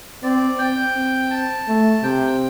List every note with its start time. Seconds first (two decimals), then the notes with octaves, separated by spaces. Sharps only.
0.23 C4 D5
0.58 C4 G5
0.95 C4
1.31 A5
1.68 A3
2.03 C3 G5